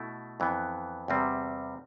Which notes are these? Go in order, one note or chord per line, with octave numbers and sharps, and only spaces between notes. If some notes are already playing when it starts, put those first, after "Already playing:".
Already playing: B2 A3 E4
F2 E3 B3
E2 C3 G3 C4